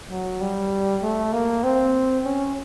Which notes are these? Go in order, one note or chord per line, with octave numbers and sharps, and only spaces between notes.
F#3
G3
A3
A#3
C4
C#4